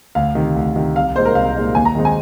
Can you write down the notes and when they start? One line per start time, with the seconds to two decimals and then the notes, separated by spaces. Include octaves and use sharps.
0.15 D2 F5
0.35 C3 D#3
0.56 D2
0.76 C3 D#3
0.96 C2 F5
1.16 A#2 G#3 D#4 C5
1.25 A#4
1.35 C2 F5
1.56 A#2 G#3 D#4
1.75 D#2 G#5
1.85 A#5
1.95 D#3 G#3 C4 D#4
2.05 G#5